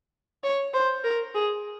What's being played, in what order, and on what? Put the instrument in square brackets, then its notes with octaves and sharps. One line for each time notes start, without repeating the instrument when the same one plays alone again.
[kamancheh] C#5
C5
A#4
G#4